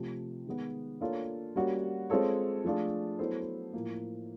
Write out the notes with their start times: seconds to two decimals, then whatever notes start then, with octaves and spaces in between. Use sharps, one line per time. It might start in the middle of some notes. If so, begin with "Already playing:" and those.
Already playing: C3 F3 A3
0.46 D#3 G#3 B3
1.01 A#3 D4 F4 A4 C#5
1.56 G3 A#3 C#4 F#4
2.10 G#3 C4 F4 A4 C#5
2.64 F3 A3 D4 F4 G#4
3.19 F#3 B3 E4 A4 C5
3.73 A2 F3 A#3